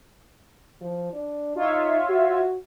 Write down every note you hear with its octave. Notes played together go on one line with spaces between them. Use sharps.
F3
D4
D#4 F4 C#5 E5
F#4